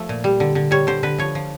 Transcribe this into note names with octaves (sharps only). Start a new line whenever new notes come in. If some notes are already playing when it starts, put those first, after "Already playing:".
Already playing: F3 A3
A#2
G3
D3
D3
G3 C#5
D3 C5
D3 B4
F3 C#5
F3